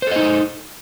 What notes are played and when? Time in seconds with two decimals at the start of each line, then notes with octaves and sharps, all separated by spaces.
0.02 C5
0.07 A4
0.12 D#5
0.16 D#4